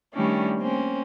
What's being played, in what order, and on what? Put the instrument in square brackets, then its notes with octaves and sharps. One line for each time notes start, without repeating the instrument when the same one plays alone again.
[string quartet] D#3 G3 A3 C#4 D4 E4
A#3 C4 C#4